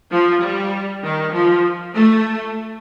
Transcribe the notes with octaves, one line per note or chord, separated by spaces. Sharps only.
F3
G3
D#3
F3
A3